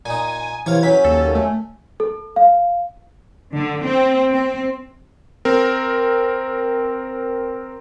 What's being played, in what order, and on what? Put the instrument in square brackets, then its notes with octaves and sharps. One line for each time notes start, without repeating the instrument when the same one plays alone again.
[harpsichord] A#2 D#4 [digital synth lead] G#5
[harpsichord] C3 C#5 F5 [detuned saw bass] E3 [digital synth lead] G#6
[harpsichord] F#2 F#3 [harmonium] C#4 [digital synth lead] B6
[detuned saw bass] D#2 [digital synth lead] A4
[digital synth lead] A3
[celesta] A4
F5
[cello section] D3
C4
C4
[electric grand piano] C4 A#4